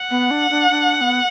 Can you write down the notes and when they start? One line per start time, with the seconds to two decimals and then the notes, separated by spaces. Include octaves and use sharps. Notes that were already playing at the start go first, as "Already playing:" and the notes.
Already playing: F#5
0.11 B3
0.31 D4
0.50 D4
0.70 D4
0.96 D4
1.01 B3